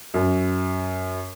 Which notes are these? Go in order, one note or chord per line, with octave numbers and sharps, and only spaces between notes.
F#2